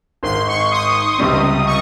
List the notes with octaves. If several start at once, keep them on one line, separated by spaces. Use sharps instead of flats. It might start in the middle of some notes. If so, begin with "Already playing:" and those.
G#1 G#2 D#3 C6
C#6
D#6
C#2 C3 G3 C4
C#6